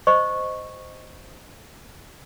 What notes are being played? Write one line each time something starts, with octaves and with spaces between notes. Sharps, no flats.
C5 D#5 C#6